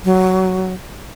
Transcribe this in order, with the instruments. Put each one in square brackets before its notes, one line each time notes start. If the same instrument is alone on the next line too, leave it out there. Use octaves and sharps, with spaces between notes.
[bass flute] F#3